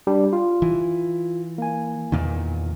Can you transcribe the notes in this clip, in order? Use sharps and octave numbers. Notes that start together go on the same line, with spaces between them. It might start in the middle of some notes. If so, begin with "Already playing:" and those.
G3 D4 G4
F4
E3
A#3 G#5
E2 A#2 D#3